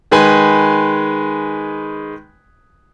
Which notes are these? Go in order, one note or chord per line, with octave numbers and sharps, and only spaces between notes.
D#3 G#3 B4 G#5 B5